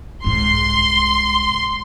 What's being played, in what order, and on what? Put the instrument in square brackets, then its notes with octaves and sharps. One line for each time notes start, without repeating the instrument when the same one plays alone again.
[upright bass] C2 G#2 [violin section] C6